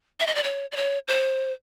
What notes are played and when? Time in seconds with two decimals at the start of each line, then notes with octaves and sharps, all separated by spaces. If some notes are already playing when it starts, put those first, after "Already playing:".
0.20 E5
0.27 D#5
0.35 D5
0.44 C#5
0.72 D5
0.76 C#5
1.08 C5